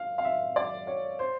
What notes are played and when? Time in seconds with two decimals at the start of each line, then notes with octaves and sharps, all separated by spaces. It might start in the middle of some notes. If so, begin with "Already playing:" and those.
Already playing: F5
0.18 F5
0.25 E5
0.56 D5
0.87 C#5
1.19 C5